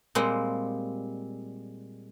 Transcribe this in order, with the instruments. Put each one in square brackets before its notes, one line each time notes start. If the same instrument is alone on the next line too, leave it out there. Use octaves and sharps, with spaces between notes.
[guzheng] A#2 G3 G#3 C4